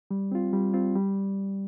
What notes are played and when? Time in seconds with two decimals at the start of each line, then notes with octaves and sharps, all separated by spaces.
0.11 G3
0.32 C4 F4
0.53 G3
0.74 C4 F4
0.95 G3